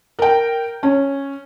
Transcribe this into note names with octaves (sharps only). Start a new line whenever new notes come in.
A#4 G5
C#4